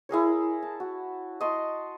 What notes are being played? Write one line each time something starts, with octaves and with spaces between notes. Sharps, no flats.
E4 G#4 A#4 C#5
A5
F#4
D#5 A5 C6 C#6